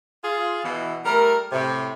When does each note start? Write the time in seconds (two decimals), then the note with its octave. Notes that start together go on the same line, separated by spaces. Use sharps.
0.24 F4 G#4
0.64 B2 E3
1.05 G3 A3 A#4
1.52 A2 C3